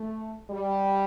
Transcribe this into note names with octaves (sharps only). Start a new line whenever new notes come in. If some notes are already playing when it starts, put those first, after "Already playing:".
Already playing: A3
G3